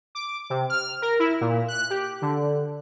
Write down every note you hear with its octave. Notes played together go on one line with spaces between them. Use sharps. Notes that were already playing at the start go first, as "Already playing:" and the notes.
D6
C3
F6
A#4
E4
A#2
F#6
G4
D3